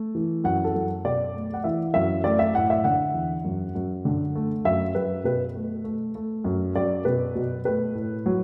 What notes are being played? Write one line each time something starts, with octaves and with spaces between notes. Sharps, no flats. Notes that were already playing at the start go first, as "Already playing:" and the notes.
Already playing: A3
E3
F#2 F#5
A4
F#2
B2 D5
A3
F#5
E3 E5
F#2 E5
A3 D5
E5
A2 F#5
E5
D3 F#5
E2
F#2
F#2
D3
A3
F#2 E5
F#2 B4
B2 B4
A3
A3
A3
F#2
F#2 D5
B2 B4
B2
A3 B4
A2
F#3